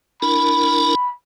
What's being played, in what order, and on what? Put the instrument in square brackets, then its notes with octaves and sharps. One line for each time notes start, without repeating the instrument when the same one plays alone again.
[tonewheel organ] D4 E4 A#4 [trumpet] B5